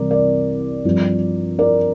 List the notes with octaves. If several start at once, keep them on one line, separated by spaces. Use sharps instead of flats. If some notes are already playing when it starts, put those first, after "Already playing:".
Already playing: C2 C3 E3 G3 A#4 D5
A#4 D5
G2 F3 C4
A#4 D5